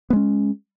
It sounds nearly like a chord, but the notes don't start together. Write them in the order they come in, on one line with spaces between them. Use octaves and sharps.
B3 G#3 C#4